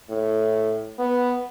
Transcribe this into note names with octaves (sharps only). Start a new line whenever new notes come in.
A2
B3